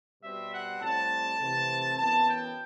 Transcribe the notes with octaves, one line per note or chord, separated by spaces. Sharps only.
B2 G3 C4 E5
F#5
A2 G3 C4 A5
C3 E3 A3 C4
F#2 E3 B3 A5
G5